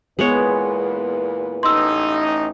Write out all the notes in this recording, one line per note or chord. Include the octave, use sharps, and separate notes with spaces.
E2 A#2 G#3 B3 B4 C#5
A1 D#4 C6 E6